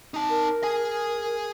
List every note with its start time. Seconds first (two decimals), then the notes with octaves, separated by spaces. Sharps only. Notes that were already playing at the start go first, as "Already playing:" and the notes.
0.14 D#4 A5
0.30 A#4
0.63 G#4 G#5